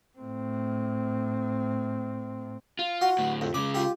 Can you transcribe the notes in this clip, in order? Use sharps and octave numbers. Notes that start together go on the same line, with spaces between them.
A2 C4
F4
F#4
D2 A2
F2
C#3 G#3 D6
F4 G4